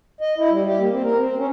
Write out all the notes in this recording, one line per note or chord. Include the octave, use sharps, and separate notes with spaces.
D#5
E4
G3
G4
A#3
C4
A#4
C4
C#4